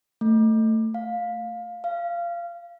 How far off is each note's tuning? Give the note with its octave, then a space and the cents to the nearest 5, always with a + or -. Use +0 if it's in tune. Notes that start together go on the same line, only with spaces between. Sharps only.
A3 +15
F5 +15
F5 -20